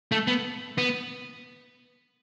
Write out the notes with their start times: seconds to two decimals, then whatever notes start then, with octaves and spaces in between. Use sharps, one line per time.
0.12 A3
0.27 B3
0.78 B3